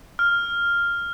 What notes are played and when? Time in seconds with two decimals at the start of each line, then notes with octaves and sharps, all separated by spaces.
0.19 F6